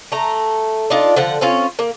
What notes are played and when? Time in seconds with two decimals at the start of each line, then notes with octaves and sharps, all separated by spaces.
0.12 A3 A#5
0.90 D4 D#4 F4
1.16 D3 F3 F#5
1.41 C4 C#4 F4
1.79 A#3